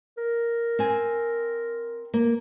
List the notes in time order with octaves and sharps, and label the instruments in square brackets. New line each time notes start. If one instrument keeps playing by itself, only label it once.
[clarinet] A#4
[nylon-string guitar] C4 G#5
A#3